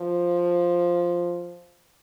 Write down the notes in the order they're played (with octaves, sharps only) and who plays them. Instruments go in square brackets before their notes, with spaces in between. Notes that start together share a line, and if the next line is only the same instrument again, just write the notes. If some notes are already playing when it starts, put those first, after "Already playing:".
Already playing: [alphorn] F3